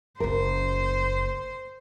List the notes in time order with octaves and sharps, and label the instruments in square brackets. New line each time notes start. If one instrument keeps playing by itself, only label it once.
[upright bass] F#1 A#3 [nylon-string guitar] A#4 [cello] C5